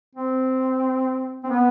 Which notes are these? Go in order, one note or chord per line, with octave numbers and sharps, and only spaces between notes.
C4
C4
B3